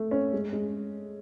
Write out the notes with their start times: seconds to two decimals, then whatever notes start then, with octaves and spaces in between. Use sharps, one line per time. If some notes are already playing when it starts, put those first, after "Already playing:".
Already playing: A3
0.11 C#4
0.33 G#3
0.53 G#3